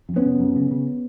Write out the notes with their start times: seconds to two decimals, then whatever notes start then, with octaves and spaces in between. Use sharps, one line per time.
0.09 F2
0.16 B3 C#4
0.25 C3
0.40 F#2
0.56 C#3
0.71 C#3